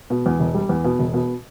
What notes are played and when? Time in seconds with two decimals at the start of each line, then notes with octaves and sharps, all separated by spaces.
0.10 B2
0.26 E2
0.40 E1
0.54 G3
0.69 E2
0.84 B2
0.99 E1
1.14 B2